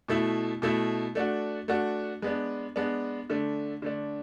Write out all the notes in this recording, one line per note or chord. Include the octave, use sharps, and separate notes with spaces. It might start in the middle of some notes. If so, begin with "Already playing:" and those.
B2 A3 E4
B2 A3 E4
A3 D4 F#4
A3 D4 F#4
G#3 B3 D4
G#3 B3 D4
D3 A3 D4
D3 A3 D4